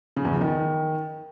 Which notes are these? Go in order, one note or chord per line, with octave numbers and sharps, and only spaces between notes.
C#3
E2
F3
D#3